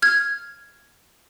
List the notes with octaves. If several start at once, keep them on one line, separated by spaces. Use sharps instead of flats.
F6 G#6